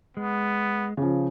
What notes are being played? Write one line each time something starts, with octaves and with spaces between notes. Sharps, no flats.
G#3 B3
C#3 F3